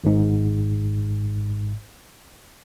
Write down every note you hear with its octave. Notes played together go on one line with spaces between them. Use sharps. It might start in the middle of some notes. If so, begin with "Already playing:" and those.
G#1 G#2